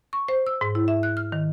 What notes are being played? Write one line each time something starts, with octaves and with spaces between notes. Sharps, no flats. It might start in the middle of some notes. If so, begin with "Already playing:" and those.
C#6
C5
E6
G#2
E4
E5
F#6
F6
D#3